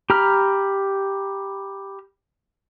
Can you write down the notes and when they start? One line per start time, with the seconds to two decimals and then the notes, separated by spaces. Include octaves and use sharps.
0.10 G4 A#5 B5 F6